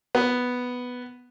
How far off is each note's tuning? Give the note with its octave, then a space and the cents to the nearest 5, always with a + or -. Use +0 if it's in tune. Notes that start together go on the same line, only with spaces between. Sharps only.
B3 +0